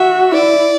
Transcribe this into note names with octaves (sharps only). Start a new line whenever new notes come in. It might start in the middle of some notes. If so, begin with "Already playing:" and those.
Already playing: F#4 E5
E4 D5